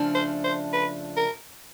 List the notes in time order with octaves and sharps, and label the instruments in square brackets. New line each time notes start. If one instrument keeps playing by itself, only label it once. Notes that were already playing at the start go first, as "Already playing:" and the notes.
Already playing: [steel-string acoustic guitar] C#3 F3 A3 D4
[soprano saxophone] C5
C5
B4
A#4